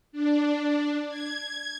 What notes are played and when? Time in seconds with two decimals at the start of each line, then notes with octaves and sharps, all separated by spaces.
0.12 D4
1.09 G#6